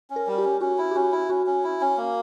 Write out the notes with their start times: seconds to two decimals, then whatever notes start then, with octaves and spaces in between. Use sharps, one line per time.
0.10 C#4
0.16 A#4
0.27 G3
0.38 G4
0.44 C#4
0.61 C#4 F#4
0.78 E4
0.91 G4
0.95 C#4 F#4
1.12 E4
1.30 C#4 F#4
1.46 C#4
1.64 E4
1.81 C#4
1.97 A#3